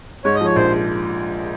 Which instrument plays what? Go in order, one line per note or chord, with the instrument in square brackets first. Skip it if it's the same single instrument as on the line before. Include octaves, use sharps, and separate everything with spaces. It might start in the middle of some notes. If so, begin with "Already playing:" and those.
[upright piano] G#2 [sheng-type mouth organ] C#5
[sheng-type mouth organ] D#5
[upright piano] F3 [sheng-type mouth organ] C#5
[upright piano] A#1 [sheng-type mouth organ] C5